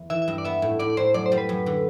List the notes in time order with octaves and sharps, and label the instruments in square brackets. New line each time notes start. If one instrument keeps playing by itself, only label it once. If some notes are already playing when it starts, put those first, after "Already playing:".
Already playing: [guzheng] E2
[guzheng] E3 [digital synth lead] E5
[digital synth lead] E5
[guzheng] G2
[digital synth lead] D5
[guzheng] B3 [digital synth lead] E5
[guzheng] A2
[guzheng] A2 [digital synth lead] D5
[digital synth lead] D5
[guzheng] A2 [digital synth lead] C5
[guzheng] F#2 [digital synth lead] D5
[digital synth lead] C5
[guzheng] G3
[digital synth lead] B4
[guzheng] F#2
D3